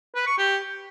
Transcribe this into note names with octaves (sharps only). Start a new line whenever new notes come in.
B4
C#6
G4